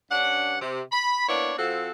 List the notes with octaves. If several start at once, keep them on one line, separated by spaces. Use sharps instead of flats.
G2 C#4 D4 F#5
C3
B5
A#3 B3 D4 E4 C#5 D5
F3 C4 F#4 A4